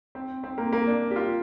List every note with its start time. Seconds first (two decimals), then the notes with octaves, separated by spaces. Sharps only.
0.15 C4
0.43 C4
0.58 A#3
0.73 A#3
0.87 D4
1.11 G4
1.16 F4